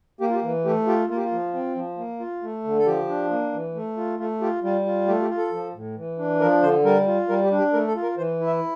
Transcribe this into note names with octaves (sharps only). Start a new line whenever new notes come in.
A#3 G4
F4
G4
E3
A3 G4
F4 G4
A#3 F4
G4
F4
F3
C4
F3
A#3
F4
A3
D3
A4
F3 G4
D4
A#3
E3
A3
F4
A3 F4
F4 G4
G3 F4
F4
A3 G4
G4
F4
A4
F3
A2
E3
D4
F3 A#4
D3 C5
G3 A#4
F4
G3 A#4
G4
D4
G4
A3 A#4
A4
F4
A#4
E3 C5
E4
E5